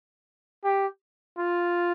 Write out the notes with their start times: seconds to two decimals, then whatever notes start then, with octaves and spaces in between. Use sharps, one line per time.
0.64 G4
1.38 F4